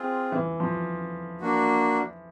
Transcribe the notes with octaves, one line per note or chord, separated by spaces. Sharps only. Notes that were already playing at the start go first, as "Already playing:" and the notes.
Already playing: C4 F4 G#4
E3
F3
A#3 D4 F#4